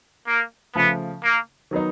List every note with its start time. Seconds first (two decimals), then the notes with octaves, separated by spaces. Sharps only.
0.27 A#3
0.75 C#3 F3 A3 B3
1.23 A#3
1.71 D#3 F#3 B3 D#4